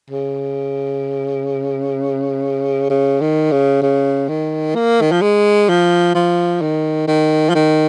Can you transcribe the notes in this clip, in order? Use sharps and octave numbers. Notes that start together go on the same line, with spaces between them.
C#3
C#3
D#3
C#3
C#3
D#3
A#3
D#3
F3
G#3
F3
F3
D#3
D#3
F3
D#3